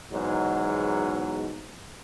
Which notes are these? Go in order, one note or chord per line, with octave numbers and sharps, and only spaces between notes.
E2 G#2 B2 F#3